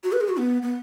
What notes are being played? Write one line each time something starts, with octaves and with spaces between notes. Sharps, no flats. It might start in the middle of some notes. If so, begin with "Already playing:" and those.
F#4
B4
G#4
F#4
B3
B3